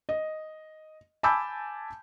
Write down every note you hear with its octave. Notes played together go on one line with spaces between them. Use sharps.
D#5
G#5 A5 B5 D6 E6 G6